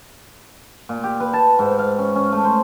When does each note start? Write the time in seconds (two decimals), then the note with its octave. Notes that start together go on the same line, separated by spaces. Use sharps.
0.89 A#2
1.04 G4
1.20 B4
1.33 A5
1.59 G#2
1.79 F5
1.99 C#4
2.16 C#4
2.32 A3
2.45 C5